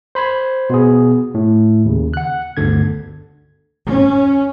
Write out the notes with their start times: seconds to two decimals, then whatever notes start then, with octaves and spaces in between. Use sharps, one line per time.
0.15 C5 B5 C6 G#6
0.70 B2 B3 G#4
1.34 A2
1.85 D#2 C#3
2.14 F#5 F#6
2.57 G1 D2 D3 G#6
3.87 C#4